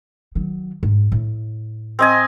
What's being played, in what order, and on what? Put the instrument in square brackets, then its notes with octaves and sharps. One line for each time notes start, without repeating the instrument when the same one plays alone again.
[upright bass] D#3 F#3
G#2
A2
[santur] C4 D#5 G#5